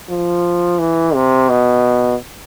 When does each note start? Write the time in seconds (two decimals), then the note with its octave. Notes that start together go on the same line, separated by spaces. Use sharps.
0.09 F3
0.79 E3
1.14 C3
1.49 B2